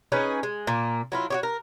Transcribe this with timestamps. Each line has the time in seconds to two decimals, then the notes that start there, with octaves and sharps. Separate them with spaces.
0.12 C#4 D#4 G#4 B4
0.43 G#3
0.67 A#2 A#3
1.12 F#3 E4 F4
1.30 F#4 G4 C#5
1.43 A#4